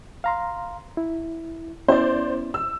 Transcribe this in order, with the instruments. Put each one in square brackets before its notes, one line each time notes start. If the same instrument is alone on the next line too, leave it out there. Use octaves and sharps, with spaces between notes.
[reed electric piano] F5 A#5 C6
E4
[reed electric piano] B3 C#4 E4 [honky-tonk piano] C5 D5
[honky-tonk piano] E6